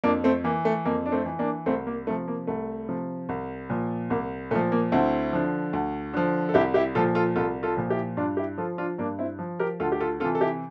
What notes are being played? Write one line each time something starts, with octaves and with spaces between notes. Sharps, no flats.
F2 A#3 D4
A3 C4
E3 A#3
A3
F2 A#3
D4
A3 C4
E3
A#3 D4
C2 A3 C4
A#3
C3 F3 A3
A#3
C2 A3
C3 F3
C2
A#2 F3
C2 A#3
A#2 F3 A3
A#3
D2 C4 E4
D3 F3
D2
D3 F3
A4
C2 E4 G4
E4 G4
A#2 F3 F4 A4
F4 A4
C2 F4 A4
F4 A4
A#2 F3
E4 G4
G2 D4 F4
E4 G4
F3 F4 A4
D4 F4
G2 A#3 D4
C4 E4
F3
G4 A#4
D2 F4 A4
G4
F4 A4
C3 E3 F4 A4
A4
E4 G4